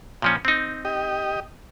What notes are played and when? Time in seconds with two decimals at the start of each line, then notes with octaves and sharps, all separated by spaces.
0.22 A#2 F3 C#4
0.45 C4 D#4
0.85 G4 D#5